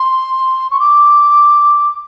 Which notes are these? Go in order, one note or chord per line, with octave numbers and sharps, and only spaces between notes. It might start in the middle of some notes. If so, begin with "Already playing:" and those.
Already playing: C6
C#6
D6